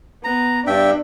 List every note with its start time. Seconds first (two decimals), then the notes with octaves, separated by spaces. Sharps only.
0.24 B3 A#5
0.67 G2 D4 E5 G5